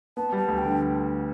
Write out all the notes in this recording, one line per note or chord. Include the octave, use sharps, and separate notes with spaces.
B3 A5
G3 A5
D2
G5
D3